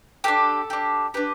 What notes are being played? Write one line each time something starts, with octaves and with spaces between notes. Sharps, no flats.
D4 G4 A4
D4 G4
D4 G4 B4